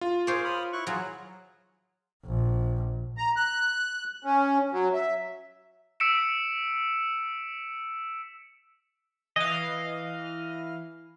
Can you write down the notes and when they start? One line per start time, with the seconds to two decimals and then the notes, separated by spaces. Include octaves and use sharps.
0.01 F4
0.27 G#4 C5 C#5 F5 D6
0.45 B5 D#6 F6
0.73 E4 C#6 F#6
0.87 F#3 F4 G#4
2.25 A#1
3.18 A#5
3.36 F#6
4.25 C#4
4.72 F#3
4.93 E5
6.00 E6 B6 C#7 D7 E7
9.36 E3 D#5 F5